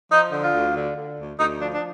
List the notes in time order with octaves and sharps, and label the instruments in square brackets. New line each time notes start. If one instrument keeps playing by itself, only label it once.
[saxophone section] F3 D#4
D3
F4
D2
D3
D3
D2
D2 D#4
F3 D4
D4